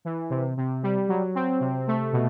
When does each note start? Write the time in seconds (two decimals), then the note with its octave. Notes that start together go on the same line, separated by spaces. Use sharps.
0.05 E3
0.30 C3
0.57 C3
0.83 G3
1.08 F#3
1.35 C4
1.60 C3
1.87 A3
2.13 B2